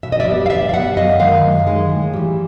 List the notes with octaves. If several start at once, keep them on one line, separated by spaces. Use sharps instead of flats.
B2 E5
D#5
D5 E5
G3 B3
F5
B2 D5 E5
F5
G3 B3 E5 F#5
F#2 D#5 F5
D#3 G#3 D#5 F5
F#2
D#3 G#3
A2
E3 G3